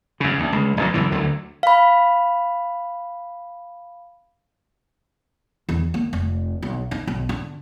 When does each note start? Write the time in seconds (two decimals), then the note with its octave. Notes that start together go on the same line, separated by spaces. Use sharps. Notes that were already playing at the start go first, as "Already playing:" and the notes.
0.20 F#2 C#3
0.38 D2
0.52 C#2
0.77 A1 G2 E3 F#3
0.94 C#2 F#2 A2 E3
1.12 D2 D3 F#3
1.63 F5 B5
5.69 E2
5.94 A#3
6.13 F1
6.62 B1
6.91 D#4
7.07 B1
7.29 D3